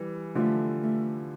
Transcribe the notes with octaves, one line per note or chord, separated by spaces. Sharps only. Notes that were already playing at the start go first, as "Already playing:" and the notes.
Already playing: E3 G3
D3 F3 A3
A3